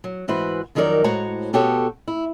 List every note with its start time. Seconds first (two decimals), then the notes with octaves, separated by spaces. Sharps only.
0.04 F#3
0.28 G#2 E3 F#4 B4 C5
0.75 F2 D#3 F#3 D#4 A#4 D5
1.04 A2 G#3 F#4 C5 C#5 A#5
1.53 B2 B3 F#4 G4 A4 C#5
2.08 E4